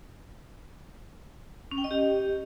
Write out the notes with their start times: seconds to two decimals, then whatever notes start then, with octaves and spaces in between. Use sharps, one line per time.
1.71 C#4
1.78 G5
1.84 D#5
1.91 G4